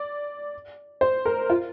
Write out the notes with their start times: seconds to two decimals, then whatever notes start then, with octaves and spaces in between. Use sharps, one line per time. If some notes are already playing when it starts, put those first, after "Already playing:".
Already playing: D5
1.01 C5
1.25 A#4
1.50 F4